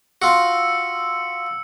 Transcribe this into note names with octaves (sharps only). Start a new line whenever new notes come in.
F4 F#4 E6 C#7